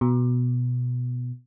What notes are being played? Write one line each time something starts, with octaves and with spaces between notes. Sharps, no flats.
B2